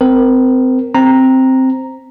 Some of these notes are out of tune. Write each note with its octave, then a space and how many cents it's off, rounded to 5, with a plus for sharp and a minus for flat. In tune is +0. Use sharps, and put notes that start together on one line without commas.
C4 -25 A#4 -5
C4 +0 A#5 +0